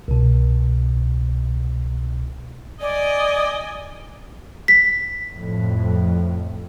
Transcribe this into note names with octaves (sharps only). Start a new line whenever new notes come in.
C2 B2
D5 D#5 G#5
B6
F2 A2